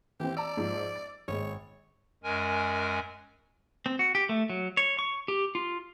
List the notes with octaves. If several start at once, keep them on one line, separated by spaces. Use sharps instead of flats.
E3 C4 G4
D5 A5 A#5 E6
G#2 F3
A6
G#1 G#3 C#5
F#2 G#3 A#4 G#5
C4
F#4
G4
A3
F#3
C#5
C#6
G4
F4